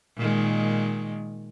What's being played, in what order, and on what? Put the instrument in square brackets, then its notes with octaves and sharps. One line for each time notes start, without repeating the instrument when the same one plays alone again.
[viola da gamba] A#2 D#3 G#3